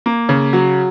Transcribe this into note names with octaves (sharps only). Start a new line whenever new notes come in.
A#3
C#3
F#3